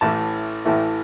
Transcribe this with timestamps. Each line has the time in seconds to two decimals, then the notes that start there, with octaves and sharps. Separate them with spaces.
0.01 A1 A2 E3 A3 A5
0.65 A1 A2 E3 A3